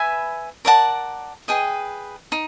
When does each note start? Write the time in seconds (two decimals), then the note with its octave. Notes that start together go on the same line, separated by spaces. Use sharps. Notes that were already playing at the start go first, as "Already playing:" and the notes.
Already playing: B4 E5 G#5 B5
0.65 A#4 D5 F#5 A5
1.48 G#4 B4 D#5 G5
2.32 D#4